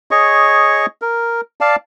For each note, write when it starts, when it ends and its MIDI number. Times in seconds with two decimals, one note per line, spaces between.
0.11 0.86 68
0.11 0.86 73
0.11 0.86 75
0.11 0.86 85
1.02 1.41 70
1.61 1.76 74
1.61 1.76 77
1.61 1.76 81